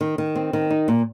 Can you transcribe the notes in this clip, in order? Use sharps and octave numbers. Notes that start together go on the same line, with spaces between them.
D#3
D#3
C4
D#3
D#4
A#2